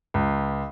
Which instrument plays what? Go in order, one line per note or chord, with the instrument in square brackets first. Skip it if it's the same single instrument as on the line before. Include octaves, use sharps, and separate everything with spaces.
[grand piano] C#2